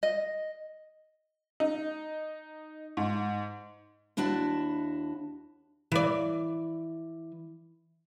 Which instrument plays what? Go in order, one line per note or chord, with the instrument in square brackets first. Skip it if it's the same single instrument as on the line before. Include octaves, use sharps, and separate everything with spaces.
[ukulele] D#5
[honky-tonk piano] D#4
G#2
[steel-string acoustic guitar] D#2 D4 E4 F#4 A5
[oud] E3 D5